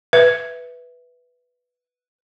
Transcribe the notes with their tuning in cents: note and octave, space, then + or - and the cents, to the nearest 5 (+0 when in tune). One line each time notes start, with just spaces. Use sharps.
B4 +0 E5 +0